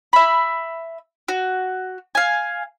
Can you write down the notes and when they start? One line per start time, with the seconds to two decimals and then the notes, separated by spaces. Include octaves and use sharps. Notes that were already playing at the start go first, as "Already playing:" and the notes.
0.13 E5 B5
1.28 F#4
2.15 F5 G#5